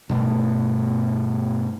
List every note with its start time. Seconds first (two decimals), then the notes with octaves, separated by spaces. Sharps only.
0.09 G2 B2 A3